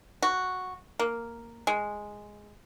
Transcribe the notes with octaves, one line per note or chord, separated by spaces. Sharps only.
F#4
A#3
G#3